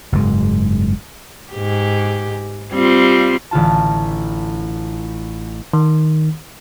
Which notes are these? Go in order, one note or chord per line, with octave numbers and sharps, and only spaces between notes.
F#1 G#2 G#3
G#2 G4
G3 C4 F4
A1 D3 F4 A5
D#3